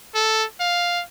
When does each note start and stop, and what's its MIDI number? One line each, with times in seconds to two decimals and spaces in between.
0.15 0.44 69
0.60 1.02 77